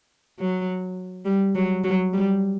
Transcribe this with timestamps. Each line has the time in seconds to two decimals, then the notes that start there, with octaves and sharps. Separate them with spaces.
0.39 F#3
1.25 G3
1.55 F#3
1.84 F#3
2.13 G3